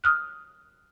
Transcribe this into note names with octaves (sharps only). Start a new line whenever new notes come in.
D#6 F6 F#6